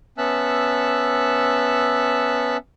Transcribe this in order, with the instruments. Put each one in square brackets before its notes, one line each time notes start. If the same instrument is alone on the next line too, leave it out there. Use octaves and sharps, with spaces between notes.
[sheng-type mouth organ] B3 C#4 E5 A5 E6 F#6